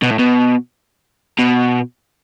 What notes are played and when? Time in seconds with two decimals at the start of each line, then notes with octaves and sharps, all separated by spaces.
0.03 B2
0.11 A2
0.19 B2
1.39 B2